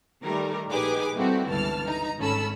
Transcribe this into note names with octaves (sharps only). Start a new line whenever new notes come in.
D#3 G3 A3 A#4
A#1 D#4 G4 G#4 B4 D6
G3 A3 C4 E4 F#4 G4
G1 C#2 E3 A5 F6
D#4 A#5
G#1 C#4 A4 B5 E6